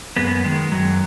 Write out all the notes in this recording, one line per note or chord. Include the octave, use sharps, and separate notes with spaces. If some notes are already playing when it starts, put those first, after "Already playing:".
F#2 G#3 B3
D#3 G#3
F#2 F#3